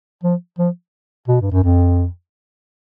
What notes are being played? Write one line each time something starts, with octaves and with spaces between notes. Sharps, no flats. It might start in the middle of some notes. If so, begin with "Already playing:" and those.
F3
F3
B2
G2
F#2
F2